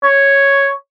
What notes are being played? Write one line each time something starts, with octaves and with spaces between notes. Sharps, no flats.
C#5